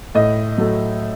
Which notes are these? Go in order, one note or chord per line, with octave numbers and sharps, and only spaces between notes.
A2 D#5
F#3 A3